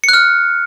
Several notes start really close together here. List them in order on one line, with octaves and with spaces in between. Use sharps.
C#7 F#6 F6